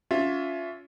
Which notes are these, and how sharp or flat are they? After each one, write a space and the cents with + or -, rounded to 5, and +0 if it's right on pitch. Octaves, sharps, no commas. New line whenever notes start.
C#4 +35 F4 +20 E5 +15